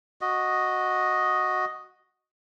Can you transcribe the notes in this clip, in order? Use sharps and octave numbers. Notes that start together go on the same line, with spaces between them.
F#4 D#5